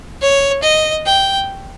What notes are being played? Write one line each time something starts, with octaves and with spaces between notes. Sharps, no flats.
C#5
D#5
G5